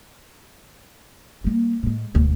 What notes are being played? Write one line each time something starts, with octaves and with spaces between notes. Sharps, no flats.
G3 A#3
A2 G#3
E1 D2